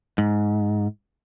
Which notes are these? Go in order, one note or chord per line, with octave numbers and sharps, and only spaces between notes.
G#2